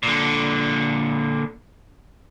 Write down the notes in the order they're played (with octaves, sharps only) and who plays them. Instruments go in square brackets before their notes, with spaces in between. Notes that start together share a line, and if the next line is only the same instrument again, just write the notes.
[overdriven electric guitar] A#2 D3